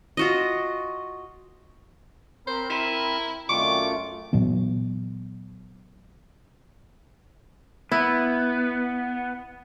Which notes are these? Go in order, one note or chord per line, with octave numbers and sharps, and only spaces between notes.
F4 F#4 D#5
C4 A#4 C5 B5
E4 B6 D#7 E7
F#2 D#3 A3 C4 D4 F4 C#6 D6
A#2 E3 F#3 B3
B3 E4